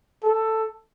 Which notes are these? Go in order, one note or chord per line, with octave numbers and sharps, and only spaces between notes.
A4